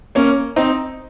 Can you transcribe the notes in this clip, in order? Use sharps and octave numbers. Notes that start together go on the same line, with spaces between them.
A#3 C#4
C4 D#4